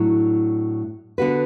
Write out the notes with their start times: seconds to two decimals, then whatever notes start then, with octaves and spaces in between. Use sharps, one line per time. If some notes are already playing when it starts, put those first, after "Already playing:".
Already playing: A2 F#3 D4
1.18 D3 B3 F#4 B4